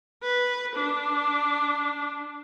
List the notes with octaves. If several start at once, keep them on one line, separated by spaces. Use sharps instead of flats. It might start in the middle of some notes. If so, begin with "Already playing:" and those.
B4
D4